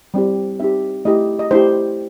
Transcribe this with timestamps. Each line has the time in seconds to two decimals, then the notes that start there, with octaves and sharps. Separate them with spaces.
0.14 G3 C4 E4 G4
0.60 C4 D#4 G4 E5
1.05 A3 E4 G4 D#5
1.39 D#5
1.51 A3 E4 G4 C5